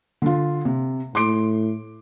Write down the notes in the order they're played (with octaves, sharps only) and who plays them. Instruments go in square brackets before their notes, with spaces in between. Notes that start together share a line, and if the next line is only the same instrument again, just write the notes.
[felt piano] D3 F4
C3
[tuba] A2 [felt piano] C6 D6 D7